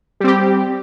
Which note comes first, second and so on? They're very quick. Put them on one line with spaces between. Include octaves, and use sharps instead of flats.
G3 C4 G4